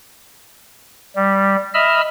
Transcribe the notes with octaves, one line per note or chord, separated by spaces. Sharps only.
G3
D#5 E5 B5 E6 F6